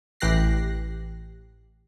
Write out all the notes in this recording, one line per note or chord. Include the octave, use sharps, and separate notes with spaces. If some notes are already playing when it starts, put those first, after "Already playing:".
A1 E3 G4 F#6 A#6 C7